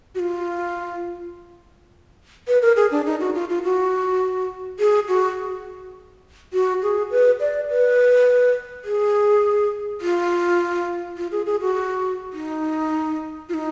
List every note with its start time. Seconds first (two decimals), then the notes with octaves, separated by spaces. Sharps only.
0.15 F#4
0.19 F4
2.48 B4
2.62 A#4
2.76 G#4
2.91 D4
3.06 D#4
3.20 F#4
3.35 F4
3.49 F4
3.63 F#4
4.79 G#4
5.08 F#4
6.53 F#4
6.83 G#4
7.11 B4
7.40 D5
7.69 B4
8.85 G#4
10.01 F4
11.17 F4
11.32 G#4
11.46 G#4
11.61 F#4
12.33 D#4
13.49 F4
13.54 D#4